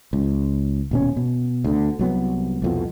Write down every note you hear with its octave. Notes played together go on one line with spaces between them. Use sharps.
C#2
D#1 B2 C#4
B2
D2 D3
C2 F#3 B3
C2 F2 B2